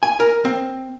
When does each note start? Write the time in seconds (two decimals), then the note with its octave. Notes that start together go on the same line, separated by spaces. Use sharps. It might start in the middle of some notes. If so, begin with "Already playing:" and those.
0.03 G#5
0.20 A#4
0.45 C4